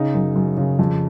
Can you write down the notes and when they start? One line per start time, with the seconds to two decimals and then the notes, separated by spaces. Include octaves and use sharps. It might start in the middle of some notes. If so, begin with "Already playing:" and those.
Already playing: C#3 D#4
0.14 F#2
0.36 F#2
0.57 C#3
0.79 F2